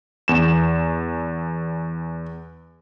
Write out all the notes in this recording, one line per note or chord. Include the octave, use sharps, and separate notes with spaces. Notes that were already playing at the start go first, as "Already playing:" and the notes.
E2 E7